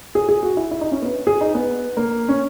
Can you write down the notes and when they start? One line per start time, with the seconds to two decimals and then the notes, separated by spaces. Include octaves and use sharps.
0.15 G#4
0.29 G#4
0.43 F#4
0.57 E4
0.71 E4
0.81 D#4
0.92 C#4
1.02 B3
1.27 G#4
1.41 D#4
1.55 B3
1.97 A#3
2.29 C#4